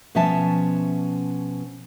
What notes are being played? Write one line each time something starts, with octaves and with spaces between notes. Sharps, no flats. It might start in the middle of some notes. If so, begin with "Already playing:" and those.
B2 F3 C#4 E5 A5